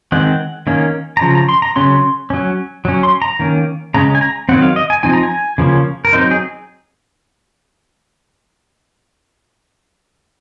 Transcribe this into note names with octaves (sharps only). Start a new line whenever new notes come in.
D#3 G#3 C4 F#5
D#3 A#3 C#4
A#5
C#3 F3
A#5
C6
A#5
C#3 F#3 C#4 C6
F#3 C#4
F#3 C#4
C6
A#5
D#3 A#3 C#4
C#3 G#3 C#4 A#5
G#5
A#5
D#3 F#3 C4 F#5
F5
D#5
G#5
F3 C4 D#4 G#5
A#5
G#5
C#3 F3 A#3 C#4
A#4
F#3 C4 D#4 C5
G#4